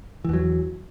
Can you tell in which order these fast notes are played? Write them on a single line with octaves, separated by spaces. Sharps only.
E3 E2 F#3